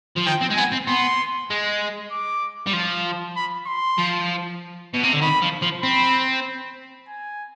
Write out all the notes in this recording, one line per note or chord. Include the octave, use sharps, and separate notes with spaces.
F3
D#3 G5
C4
G#3
B3 G#5
C4
B3 C6
G#3
D6
G3
F3
B5
C6
F3
B2
C3
D3
D#3 B5
F3
F3
C4 B5
G#5